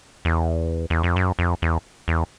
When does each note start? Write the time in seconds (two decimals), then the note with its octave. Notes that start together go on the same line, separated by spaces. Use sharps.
0.25 E2
0.90 E2
1.03 F2
1.16 F#2
1.39 F2
1.62 E2
2.08 E2